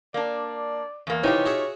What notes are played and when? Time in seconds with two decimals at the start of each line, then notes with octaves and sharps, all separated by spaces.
0.14 A#3 D4 D5
1.07 E2 A#3
1.23 C3 E3 D#4 F4 G4 C#5
1.46 F#4 G#4 E5